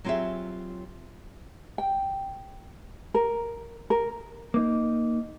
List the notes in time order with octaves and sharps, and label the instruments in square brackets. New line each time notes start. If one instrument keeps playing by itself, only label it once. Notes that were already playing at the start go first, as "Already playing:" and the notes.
[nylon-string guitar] F#3 C4 F4 G4 G#4 E5
[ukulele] G5
A#4
A#4
[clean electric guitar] A#3 D#4